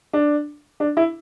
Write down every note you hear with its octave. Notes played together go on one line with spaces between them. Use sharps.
D4
D4
E4